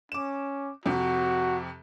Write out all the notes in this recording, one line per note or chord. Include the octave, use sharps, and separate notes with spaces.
C#4 D6 E7
F2 C3 F#4